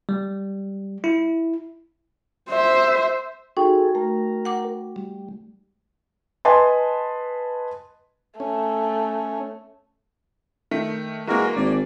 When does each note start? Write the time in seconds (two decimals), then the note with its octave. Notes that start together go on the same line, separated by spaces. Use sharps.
0.09 G3
1.04 E4
2.50 C5 E5
3.57 D#4 F#4 G#4 A4 G5 C#6
3.95 A3 A#4
4.45 F#5 D6
4.96 G3
6.45 B4 D#5 G#5 A5 C6
8.40 A3 C#4
10.71 D#3 A3
11.27 E3 G#3 A#3 F#4 A#4
11.56 G#1 D5